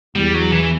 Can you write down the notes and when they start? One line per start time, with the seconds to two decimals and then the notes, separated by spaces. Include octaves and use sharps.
0.15 E2 G3
0.34 F#3
0.52 E3